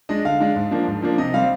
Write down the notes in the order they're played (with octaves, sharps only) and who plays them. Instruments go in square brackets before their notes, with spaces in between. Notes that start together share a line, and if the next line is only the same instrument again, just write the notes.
[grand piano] G#3 D4 D#5
D3 F5
G#3 D4
G#2
F3 A#3 D4
G#2
F3 A#3 D4
C3 D#5
G3 C4 F5